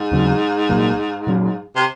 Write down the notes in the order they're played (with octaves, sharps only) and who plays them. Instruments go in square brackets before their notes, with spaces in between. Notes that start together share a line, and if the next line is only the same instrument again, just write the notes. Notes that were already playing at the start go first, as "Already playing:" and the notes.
Already playing: [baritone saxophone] G#2
[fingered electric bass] D#2 C#3 F#3 C4
C2 A#2 F#3 A#3
A#2 F#3 C#4
[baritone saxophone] C3